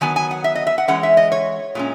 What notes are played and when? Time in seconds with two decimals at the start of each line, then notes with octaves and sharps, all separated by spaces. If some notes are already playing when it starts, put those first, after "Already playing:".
0.01 D#3 F#3 B3 G#5
0.16 G#5
0.31 F#5
0.44 E5
0.55 D#5
0.67 E5
0.78 F#5
0.88 E3 G#3 C#4 F#5
1.03 E5
1.17 D#5
1.32 C#5
1.75 A#2 G#3 C#4